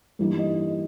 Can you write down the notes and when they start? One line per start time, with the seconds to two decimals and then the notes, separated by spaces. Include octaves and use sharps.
0.19 G2 E3 G3 A#3 D#4
0.39 D#5